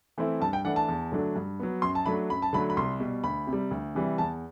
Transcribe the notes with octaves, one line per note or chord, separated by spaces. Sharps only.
E3 A3 C4 E4
G2 A5
G5
E3 A3 D4 F#5
A5
E2
D3 F#3 A3 D4
G2
F#3 B3
F#2 C6
A5
F#3 A3 D4 B5
F#2 B5
A5
D3 F#3 A3 B5
B5
C2 C6
B2 G3
D2 B5
C3
G3
D2
C3 E3 G3
E2 A5